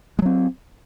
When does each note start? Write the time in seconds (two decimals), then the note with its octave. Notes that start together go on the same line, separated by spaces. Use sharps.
0.19 G#3
0.22 F#3
0.26 C4